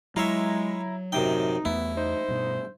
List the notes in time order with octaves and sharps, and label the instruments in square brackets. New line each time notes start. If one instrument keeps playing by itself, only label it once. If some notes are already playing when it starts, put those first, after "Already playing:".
[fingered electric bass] F#3 [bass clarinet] G#3 [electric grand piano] E4 A#5 [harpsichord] F4 C#5 E5
[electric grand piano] A1 [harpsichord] F#2 C3 G5 [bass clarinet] D#4
[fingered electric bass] E2 A3 [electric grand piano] B3 [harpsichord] E4
[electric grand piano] D#4 [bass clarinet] C5
[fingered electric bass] G2 B2